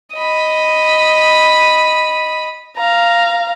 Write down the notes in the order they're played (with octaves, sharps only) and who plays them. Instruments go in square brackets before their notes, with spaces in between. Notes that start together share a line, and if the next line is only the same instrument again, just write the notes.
[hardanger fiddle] D#5 B5
[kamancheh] F5 A#5